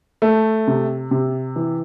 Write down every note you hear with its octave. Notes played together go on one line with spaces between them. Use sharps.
A3
C3
C3
E3